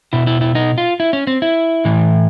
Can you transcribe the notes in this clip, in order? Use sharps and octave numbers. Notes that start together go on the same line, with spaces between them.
B2 E4
E4
E4
D#4
F4
E4
C#4
C4
E4
A2 E3